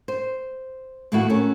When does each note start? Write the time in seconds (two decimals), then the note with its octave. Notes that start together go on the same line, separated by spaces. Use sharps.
0.08 C5
1.12 D#2 A2 E3 A3 E4 F#4
1.29 A3 C#4 F#4 A#4